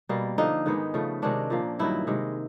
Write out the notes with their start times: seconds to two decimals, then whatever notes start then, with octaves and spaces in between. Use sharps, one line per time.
0.09 B2 G3 A#3
0.38 D3 F3 A#3 D#4
0.66 G#2 D#3 G#3 B3
0.94 C#3 F3 A3
1.22 C3 D#3 G#3 C#4 D4
1.50 A#2 F3 A#3
1.79 G2 D#3 F#3 E4
2.07 C3 D#3 G#3